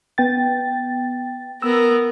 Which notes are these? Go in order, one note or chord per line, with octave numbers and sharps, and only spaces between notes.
B3 G5 A6
B3 A#4 E6